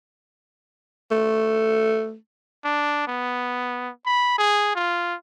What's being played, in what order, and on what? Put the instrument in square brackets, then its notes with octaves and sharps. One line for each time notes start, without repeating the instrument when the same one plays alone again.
[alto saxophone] A3
[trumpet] D4
B3
B5
G#4
F4